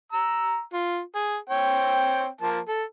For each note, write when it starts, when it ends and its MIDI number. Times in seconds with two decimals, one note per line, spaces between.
0.13 0.60 82
0.13 0.60 88
0.73 0.99 65
1.15 1.36 68
1.50 2.26 60
1.50 2.26 73
1.50 2.26 79
2.41 2.59 53
2.41 2.59 58
2.41 2.59 81
2.68 2.83 69